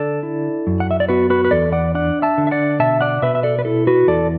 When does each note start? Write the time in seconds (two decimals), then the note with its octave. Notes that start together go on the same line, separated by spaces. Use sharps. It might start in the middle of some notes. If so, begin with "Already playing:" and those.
Already playing: D3 A4 D5
0.23 E4
0.67 F#2
0.80 F#5
0.91 E5
1.00 D5
1.09 B3 F#4 B4
1.30 F#4 B4
1.45 B4
1.51 E2 A4 D5
1.72 D5 F#5
1.94 D4 D5 F#5
2.22 E5 A5
2.38 D3
2.47 E5
2.51 D5 F#5
2.79 B2 E5 A5
3.01 D5 F#5
3.22 B2 B4 E5
3.35 E5
3.43 A4 D5
3.59 B4
3.65 E4 A4
3.87 F#4 B4
4.07 E2 A4 D5